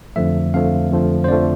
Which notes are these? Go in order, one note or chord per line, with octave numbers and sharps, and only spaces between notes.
F2 D3 F3 A3 E5
F2 D3 F3 A3 F5
F2 D3 F3 A3
C5
F2 D3 F3 A3 D5